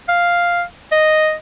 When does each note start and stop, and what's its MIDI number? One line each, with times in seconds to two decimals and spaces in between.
0.08 0.63 77
0.91 1.34 75